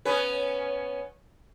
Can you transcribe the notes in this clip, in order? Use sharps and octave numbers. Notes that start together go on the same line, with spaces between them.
B3 C#4 B4